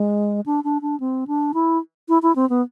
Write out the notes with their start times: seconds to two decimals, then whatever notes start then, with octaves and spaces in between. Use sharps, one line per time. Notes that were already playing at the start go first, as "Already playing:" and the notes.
Already playing: G#3
0.46 D4
0.64 D4
0.82 D4
1.00 C4
1.27 D4
1.54 E4
2.09 E4
2.22 E4
2.36 C4
2.50 B3